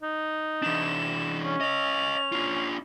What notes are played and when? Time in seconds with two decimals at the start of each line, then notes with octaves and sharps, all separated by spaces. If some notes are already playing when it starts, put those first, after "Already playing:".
0.03 D#4
0.63 E3 D4 E7
1.44 C#4
1.61 C#5 D#5 F7
2.32 D4 F4